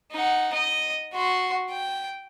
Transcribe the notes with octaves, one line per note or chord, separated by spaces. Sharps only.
D#4 F#5
D#5
F#4 C6
G5